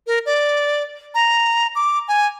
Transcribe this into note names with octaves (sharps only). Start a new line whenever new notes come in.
A#4
D5
A#5
D6
G#5